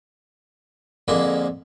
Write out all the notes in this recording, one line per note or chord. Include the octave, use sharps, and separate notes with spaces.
F2 D3 G#3 A#3 E4